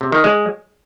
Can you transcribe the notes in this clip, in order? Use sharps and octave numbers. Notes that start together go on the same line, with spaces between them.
C3
D#3
G#3